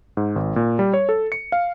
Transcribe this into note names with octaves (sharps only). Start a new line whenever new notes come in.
G#2
G#1
A#2
G3
C#5
A4
C#7
F5